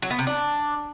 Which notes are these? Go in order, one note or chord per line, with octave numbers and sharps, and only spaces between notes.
F#3
B3
C3
D4